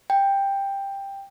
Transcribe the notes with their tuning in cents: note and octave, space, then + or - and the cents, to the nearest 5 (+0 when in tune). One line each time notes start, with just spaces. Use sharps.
G5 +10